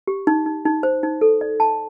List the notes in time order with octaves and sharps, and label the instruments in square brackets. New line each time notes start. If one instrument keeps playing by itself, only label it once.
[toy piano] G4
D#4
D#4
D#4
C5
D#4
A4
D5
A5